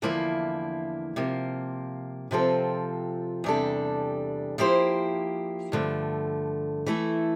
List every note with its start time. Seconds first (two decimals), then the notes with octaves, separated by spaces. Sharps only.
0.02 E2 D3 F3 A#3 E4
1.16 C3 F3 A#3
2.31 C3 F3 C4 F4 A4
3.44 E2 C3 G3 D4 A4
4.58 F3 A#3 E4 G4 C5
5.72 G2 D3 F3 A3
6.86 E3 A3 E4 A4